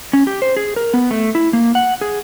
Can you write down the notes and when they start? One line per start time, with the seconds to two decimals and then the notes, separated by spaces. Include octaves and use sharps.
0.13 C#4
0.27 G4
0.42 C5
0.56 G#4
0.76 A#4
0.94 B3
1.11 A3
1.35 E4
1.53 A#3
1.75 F#5
2.01 G#4